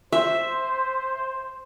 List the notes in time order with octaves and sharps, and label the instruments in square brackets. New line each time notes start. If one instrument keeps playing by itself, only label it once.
[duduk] C5 [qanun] E5